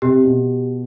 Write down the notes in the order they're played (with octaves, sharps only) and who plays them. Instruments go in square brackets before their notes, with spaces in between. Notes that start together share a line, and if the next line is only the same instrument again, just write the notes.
[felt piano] C3 [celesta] G4
[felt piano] B2